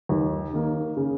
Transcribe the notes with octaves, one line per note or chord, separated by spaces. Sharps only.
D#2
D#3 A#3
C#3